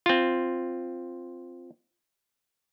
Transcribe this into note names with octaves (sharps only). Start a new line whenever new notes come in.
C4 F4